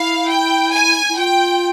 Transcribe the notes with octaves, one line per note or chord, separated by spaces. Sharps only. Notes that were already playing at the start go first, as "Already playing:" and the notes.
Already playing: E4 F5
G5
G#5
E4
F4 G5